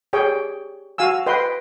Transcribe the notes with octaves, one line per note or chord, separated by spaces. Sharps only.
G4 G#4 C#5 G5
F#4 F5 G#5 E6
B4 D#5 G5 C6